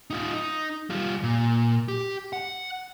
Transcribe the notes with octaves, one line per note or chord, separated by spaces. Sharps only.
D#4 F4
D#4
G3 F4
A#2
G4
F#5